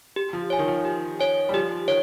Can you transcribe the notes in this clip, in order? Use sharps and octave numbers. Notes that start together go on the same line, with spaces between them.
G4
F3
C#5 G#5
D#3
F3
G4
C#5 G#5
G3
F3 G4
D#3 C#5